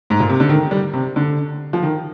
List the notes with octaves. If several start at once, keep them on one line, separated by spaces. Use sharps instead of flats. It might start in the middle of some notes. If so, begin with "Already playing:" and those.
G#2
A#2
C3
D3
D#3
G3
C3
D3
F3
D#3